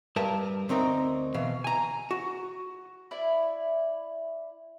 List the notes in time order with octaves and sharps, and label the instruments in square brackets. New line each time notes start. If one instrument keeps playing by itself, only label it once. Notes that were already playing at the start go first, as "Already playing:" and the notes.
[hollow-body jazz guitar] G2 A#4 B4 A5
D2 C4 D#4 A#4
B2 E3 F5
G#5 A#5
F#4
[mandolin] E4 D5